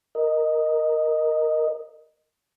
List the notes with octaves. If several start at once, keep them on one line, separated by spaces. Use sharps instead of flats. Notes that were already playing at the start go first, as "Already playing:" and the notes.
A#4 D#5